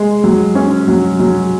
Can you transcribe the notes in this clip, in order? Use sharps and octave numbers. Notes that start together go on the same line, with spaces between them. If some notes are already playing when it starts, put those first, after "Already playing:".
Already playing: G#3
F#3
C#4
F#3
F#3